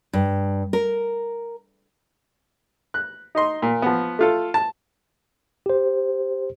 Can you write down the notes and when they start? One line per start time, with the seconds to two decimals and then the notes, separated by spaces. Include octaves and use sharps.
0.13 G2
0.73 A#4
2.94 F#6
3.35 D#4 D#5 C6
3.62 A#2
3.82 F3 B3
4.19 A3 F4 A4
4.54 A5
5.66 G4 C5